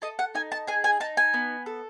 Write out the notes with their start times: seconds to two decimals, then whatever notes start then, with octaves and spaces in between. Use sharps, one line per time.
0.02 A4 D#5
0.19 F#5
0.35 D#4 G#5
0.52 A5
0.67 G#4 G#5
0.84 G#5
1.00 D#4 A5
1.17 G#5
1.34 B3
1.66 A4